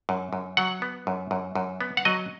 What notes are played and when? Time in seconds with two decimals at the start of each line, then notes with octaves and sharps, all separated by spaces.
0.09 F#2
0.33 F#2
0.57 F#3 F#5
0.82 B3
1.07 F#2
1.31 F#2
1.55 F#2
1.81 B3
1.97 F#5
2.05 F#3 D#5